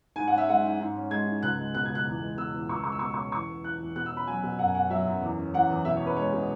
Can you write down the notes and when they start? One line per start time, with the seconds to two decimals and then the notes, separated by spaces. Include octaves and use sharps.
0.16 G#2 G#5
0.27 C#4 F#5
0.38 E5
0.49 G#3 F#5
0.63 G#2
0.80 G#2
0.96 C#4
1.11 G#3 G#6
1.27 G#2
1.43 C#2 F#6
1.59 G#3
1.74 B2 F#6
1.85 C#2 G#6
1.95 F#6
2.07 E2
2.21 G#3
2.38 B2 E6
2.54 E2
2.69 C#2 C#6
2.76 E6
2.84 G#3 C#6
2.92 E6
2.99 B2 C#6
3.06 E6
3.14 C#6
3.17 C#4
3.32 E2 C#6
3.49 B3
3.64 E3 F#6
3.80 E2
3.96 B2 F#6
4.06 E6
4.11 C#4
4.17 B5
4.27 F#3 G#5
4.43 B2
4.59 F#2 F#5
4.68 G#5
4.75 C#4 F#5
4.90 F#3 E5
5.06 F#2
5.22 E2
5.38 C#4
5.54 E3 F#5
5.70 E2
5.85 B2 E5
5.97 C#5
6.01 C#4
6.06 B4
6.16 G#3 C#5
6.33 B2